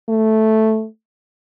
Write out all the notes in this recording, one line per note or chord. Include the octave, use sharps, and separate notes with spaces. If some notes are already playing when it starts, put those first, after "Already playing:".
A3